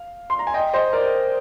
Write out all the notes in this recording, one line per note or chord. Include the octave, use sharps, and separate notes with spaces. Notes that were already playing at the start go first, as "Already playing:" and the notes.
Already playing: F5
C6
A#5
G#5
D#5 G5
C5 D#5
A#4 D5